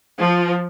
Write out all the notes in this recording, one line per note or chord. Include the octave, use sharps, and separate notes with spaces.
F3